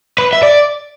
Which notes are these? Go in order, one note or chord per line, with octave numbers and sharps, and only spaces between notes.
B4
E5
D5